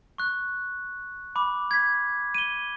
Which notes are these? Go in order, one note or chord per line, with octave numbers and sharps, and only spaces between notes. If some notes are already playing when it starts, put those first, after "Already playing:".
C#6 F#6
B5 D6
G#6 B6
D#7 G7